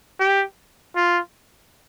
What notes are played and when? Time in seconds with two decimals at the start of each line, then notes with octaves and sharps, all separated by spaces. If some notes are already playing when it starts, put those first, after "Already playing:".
0.20 G4
0.96 F4